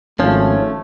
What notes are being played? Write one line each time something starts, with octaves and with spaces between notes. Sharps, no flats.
G#1 F3 A3 C#4